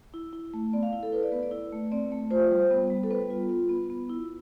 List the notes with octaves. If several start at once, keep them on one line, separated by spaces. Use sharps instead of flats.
E4
E4
A3
B3 D5
F5
E4
A4
E4 B4
D5
B3 B4
D5
E4
A3
C4 D5
A3
F4 C5
G3
B3
G3
A4
B3 B4
F4
F4
B3
B3
E4